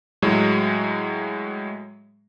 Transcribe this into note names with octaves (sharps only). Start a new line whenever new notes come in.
A2 F#3 G#3